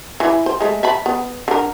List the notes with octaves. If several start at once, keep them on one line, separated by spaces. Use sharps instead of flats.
E3 E4
C5
G#3 A3
E5 A5 B5
B3
D3 A#4